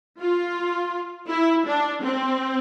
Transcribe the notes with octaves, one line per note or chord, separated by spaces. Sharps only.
F4
E4
D4
C4